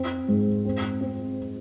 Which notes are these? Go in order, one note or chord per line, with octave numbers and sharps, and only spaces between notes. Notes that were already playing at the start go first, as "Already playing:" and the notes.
Already playing: C4
G#2
C4
C4